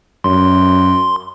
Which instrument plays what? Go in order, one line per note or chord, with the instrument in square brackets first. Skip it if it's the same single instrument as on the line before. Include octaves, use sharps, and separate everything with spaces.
[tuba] F#2 [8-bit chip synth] C6